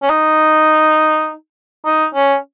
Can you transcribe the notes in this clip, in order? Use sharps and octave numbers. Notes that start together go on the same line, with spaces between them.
C#4
D#4
D#4
C#4